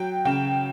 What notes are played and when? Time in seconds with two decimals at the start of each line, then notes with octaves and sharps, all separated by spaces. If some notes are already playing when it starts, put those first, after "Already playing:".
Already playing: F#3 G5
0.25 C#3 G5